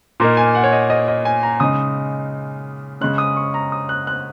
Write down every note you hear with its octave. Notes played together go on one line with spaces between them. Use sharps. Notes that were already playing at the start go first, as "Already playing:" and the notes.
A#2 A#3 D#4 A#5
G#5
F#5
C#5
D#5
D#5
D#5
G#5
A#5
C#3 G#3 D#4 D#6
C#3 G#3 C#4 F#6
D#6
C#6
A#5
D#6
F#6
F#6